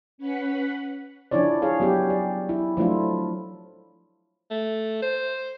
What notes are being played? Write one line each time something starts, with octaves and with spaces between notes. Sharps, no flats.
C#4 B4 F#5 B5
F3 C#4 D4 E4 C#5 D5
E4 G#4 C#5 F5
F#3 B3 C#4 G4
D5
E4
F3 F#3 A3 D4 E4 F4
A3
C5